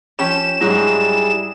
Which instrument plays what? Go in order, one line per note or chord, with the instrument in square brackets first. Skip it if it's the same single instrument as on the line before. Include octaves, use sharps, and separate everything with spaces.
[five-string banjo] F3 C#4 G4 [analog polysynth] E7
[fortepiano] G#2 F#3 [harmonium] G3 E4 G#4